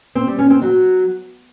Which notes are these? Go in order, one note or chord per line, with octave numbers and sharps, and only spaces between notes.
C4
G3
C#4
C4
F#3